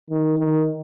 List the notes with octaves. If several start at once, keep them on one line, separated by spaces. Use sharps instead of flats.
D#3
D#3